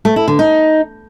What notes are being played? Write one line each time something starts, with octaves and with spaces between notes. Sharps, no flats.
A3
E4
D3
D#4